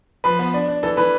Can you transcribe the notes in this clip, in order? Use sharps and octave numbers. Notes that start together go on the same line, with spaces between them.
F3 B4
B3
D4
D4
E3 A4
E3 B4